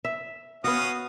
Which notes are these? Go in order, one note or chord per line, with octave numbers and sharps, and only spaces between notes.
E5
B3 C#4 F#4 F5 D#6